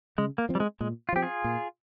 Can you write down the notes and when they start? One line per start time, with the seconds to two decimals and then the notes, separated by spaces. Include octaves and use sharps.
0.18 C#3 G#3
0.38 A#3
0.49 F3 C4
0.55 G3
0.60 G#3
0.81 A#2 G#3
1.09 F4
1.13 F3 C4 G4
1.23 F4 G#4
1.44 A#2